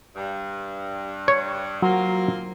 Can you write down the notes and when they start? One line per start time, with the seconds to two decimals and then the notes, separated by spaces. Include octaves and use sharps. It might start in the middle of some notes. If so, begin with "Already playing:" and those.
0.16 G2
1.28 C#5
1.82 F#3 A#3 C4 F4